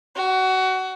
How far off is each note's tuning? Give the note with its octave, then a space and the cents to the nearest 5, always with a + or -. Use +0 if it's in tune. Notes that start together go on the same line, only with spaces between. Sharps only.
F#4 +25